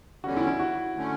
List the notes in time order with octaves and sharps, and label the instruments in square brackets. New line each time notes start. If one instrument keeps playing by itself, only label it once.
[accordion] E2 D3 G3 C#4 [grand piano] F#4
[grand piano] E4
E4
F#4
[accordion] D3 A3 C#4